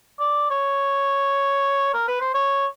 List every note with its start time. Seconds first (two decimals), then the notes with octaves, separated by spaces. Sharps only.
0.19 D5
0.50 C#5
1.94 A#4
2.07 B4
2.20 C5
2.34 C#5